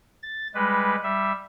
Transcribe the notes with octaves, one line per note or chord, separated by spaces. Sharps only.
A6
G3 G#3 B4
G3 E5